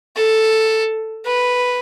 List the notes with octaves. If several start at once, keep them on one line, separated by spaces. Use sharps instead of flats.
A4
B4